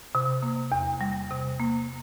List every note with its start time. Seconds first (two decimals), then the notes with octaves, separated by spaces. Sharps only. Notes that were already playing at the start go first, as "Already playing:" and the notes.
0.15 C3
0.43 A#3
0.72 E2
1.01 G3
1.31 C3
1.60 A#3